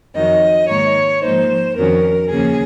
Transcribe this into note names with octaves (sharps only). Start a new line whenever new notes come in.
F2 D#3 F#3 D#5
G#2 D#3 A#3 D#4 C#5
G#2 F3 A#3 D#4 C5
F2 D#3 F#3 C#4 A#4
D#2 C#3 F3 A#3 C#4 G#4